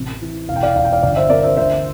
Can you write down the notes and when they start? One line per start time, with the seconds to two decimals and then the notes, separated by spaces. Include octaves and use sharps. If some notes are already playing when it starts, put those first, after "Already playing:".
Already playing: A1 C3
0.22 E3
0.48 E1 F5
0.56 G5
0.63 D5 F5
0.76 E1 F5
0.84 G5
0.93 D5 F5
1.03 G1 D5 F5
1.16 C5 E5
1.30 C3 A#4 D5
1.43 C5 E5
1.57 D2 C5 E5